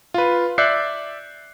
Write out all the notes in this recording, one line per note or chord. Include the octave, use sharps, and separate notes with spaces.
F4 B4
D5 E5 F#6 G6 C7 C#7